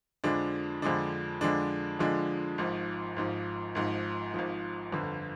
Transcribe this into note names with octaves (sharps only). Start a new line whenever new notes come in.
F2 D3 F3 G#3 D4
F2 D3 F3 G#3 D4
F2 D3 F3 G#3 D4
F2 D3 F3 G#3 D4
G#1 G#2 F3
G#1 G#2 F3
G#1 G#2 F3
G#1 G#2 F3
G1 F2 D3